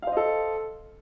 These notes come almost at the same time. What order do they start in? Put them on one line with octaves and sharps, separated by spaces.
F5 C5 D#5 A4